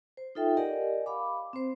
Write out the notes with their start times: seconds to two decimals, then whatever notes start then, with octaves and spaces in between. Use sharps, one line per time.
0.17 C5
0.35 D#4 F4 A4 E5 G5
0.57 G4 A#4 D5 D#5 F#5 G#5
1.06 F5 B5 D6
1.53 C4 C5